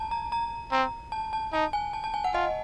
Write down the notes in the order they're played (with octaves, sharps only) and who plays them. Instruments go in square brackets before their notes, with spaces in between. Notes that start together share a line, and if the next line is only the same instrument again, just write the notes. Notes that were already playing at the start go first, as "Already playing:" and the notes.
Already playing: [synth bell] A5 A#5
A#5
A#5
[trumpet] C4 [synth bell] A#5
[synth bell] A5
A5
[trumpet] D#4 [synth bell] A5
[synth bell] G#5
A5
A5
G#5
F#5
[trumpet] F4 [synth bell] D#5